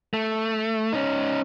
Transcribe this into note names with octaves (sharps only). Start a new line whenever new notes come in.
A3
C#4 D#4